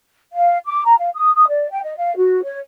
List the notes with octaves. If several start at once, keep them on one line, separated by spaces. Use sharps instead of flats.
F5
D6
A#5
F5
D#6
D#6
D5
G5
D#5
F5
F#4
C#5